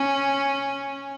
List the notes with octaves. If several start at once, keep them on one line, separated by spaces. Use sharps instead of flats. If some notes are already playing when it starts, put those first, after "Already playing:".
Already playing: C#4